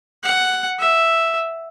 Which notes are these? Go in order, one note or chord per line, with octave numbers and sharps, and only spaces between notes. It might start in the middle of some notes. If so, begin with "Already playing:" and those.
F#5
E5